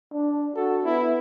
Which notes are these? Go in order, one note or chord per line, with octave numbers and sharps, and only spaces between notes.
D4
F#4 A4
B3 E4